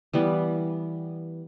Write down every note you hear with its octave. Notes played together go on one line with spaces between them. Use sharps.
E3 G3 B3